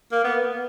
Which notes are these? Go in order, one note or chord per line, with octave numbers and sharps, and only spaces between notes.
A#3
B3